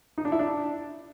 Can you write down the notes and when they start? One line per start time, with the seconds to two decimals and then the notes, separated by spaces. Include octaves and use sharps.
0.18 D#4
0.25 D4
0.32 E4
0.39 D4